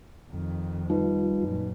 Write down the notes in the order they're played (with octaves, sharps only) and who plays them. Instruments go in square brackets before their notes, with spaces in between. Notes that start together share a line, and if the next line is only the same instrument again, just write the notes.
[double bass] F2 D#3
[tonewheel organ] G3 F4 [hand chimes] D#4 B4
[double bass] F#2 A#2